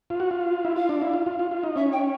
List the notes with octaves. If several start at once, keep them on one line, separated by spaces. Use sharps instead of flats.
F4
F#4
F4
E4
F4 F5
D4
E4
F4
F4
F4
F4
D#4
C#4 E5
G5